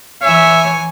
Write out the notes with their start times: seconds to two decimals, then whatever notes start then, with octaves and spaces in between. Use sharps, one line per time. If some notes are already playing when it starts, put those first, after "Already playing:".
0.22 E3 C#5 E5 G#5